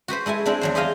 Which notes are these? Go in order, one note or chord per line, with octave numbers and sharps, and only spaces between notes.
F#4 G4 B4 C5
G#3 E4 A4 G#5
G#3 C4 D4 E4 G4
E2 F#3 C5
G4 G#4 C5 D#5 F5 G5